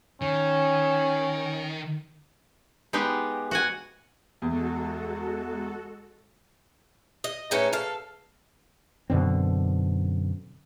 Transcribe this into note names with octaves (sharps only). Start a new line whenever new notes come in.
D#3 C#4
G#3 B3 D#4 G4
F#4 F#5 G#5
E2 G#3 F#4 A4
D#5
A2 C#4 D#4 G#4 B4 C#7
A4 F5
F#2 B2 D3 C4